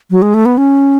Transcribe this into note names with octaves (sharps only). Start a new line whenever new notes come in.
F#3
G#3
A3
B3
C#4